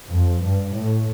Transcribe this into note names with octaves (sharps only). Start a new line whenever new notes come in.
F2
G2
A2